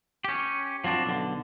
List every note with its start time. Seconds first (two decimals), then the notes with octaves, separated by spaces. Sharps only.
0.24 C#4 G4
0.84 F3 F#3 C4 D4
1.06 B1 D3